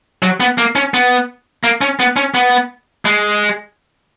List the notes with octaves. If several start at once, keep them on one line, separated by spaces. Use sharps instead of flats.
F#3
B3
A#3
C#4
B3
A#3
C#4
B3
C#4
B3
G#3